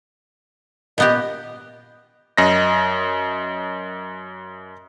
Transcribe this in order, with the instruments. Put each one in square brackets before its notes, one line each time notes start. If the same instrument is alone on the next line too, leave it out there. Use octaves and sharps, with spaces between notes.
[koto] A#2 B3 G4 [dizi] D#5
[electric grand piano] F#2 D#5 A#6